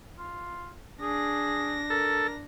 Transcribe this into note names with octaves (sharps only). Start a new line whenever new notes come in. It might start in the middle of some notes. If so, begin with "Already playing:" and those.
F4
D4 G#4 A#6
A4 A#4